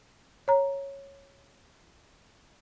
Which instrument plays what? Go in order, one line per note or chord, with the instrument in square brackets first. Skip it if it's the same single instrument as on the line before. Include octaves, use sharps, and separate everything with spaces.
[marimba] C#5 A#5